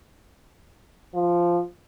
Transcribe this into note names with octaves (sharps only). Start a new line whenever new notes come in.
F3